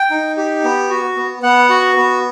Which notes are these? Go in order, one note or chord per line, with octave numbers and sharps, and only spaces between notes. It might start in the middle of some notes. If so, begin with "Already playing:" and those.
Already playing: G5
D#4
G4
B3
F#4
B3
B3 F#5
F#4
B3